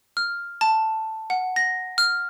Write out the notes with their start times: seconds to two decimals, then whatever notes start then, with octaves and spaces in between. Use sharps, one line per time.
0.17 F6
0.61 A5
1.30 F#5
1.56 A#6
1.98 F6